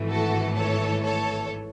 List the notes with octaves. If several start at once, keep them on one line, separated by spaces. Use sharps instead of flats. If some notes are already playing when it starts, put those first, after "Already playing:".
Already playing: G#1 G#2 E3 A3
F#4 A4
A4 C#5
A4 C#5